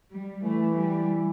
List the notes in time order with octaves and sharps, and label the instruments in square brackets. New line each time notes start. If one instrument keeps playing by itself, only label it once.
[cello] G3
[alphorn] E3 [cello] A3
[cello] G3